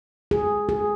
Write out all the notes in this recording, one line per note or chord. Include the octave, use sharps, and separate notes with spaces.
G#4
G#4